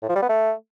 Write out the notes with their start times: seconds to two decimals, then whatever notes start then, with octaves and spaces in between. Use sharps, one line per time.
0.02 A2
0.09 F3
0.16 G3
0.22 B3
0.29 A3